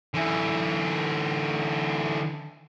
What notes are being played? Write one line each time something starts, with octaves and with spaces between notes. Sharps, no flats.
D3 E3